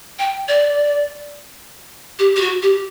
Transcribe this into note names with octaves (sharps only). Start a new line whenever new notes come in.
G5
D5
G4
G4
F#4
G4